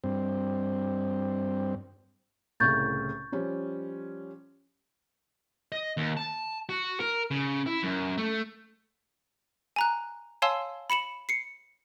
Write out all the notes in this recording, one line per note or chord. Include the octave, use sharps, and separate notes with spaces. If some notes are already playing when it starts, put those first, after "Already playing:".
G2 C4
C2 A2 C#3 C#6 G6 A6
F3 G3 C#4
D#5
D#2
A5
F#4
A#4
C#3
E4
F#2
A3
G#5 A#5 F#6
C#5 F5 G#5 A5 C6 E6
B5 C#7 E7 F#7
C7 C#7